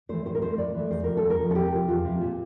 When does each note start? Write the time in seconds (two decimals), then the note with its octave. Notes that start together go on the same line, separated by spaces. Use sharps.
0.09 E3 A3 C5
0.25 A2 C5
0.35 A#4
0.42 E3 A3 C5
0.58 A2 D5
0.74 E3 A3
0.90 E2 C5
1.04 C3 F3 A#4
1.17 A4
1.23 E2
1.30 A#4
1.39 C3 F3
1.51 A4
1.55 E2 G4
1.72 C3 F3
1.88 E2 F4
2.05 C3 F3
2.21 A#2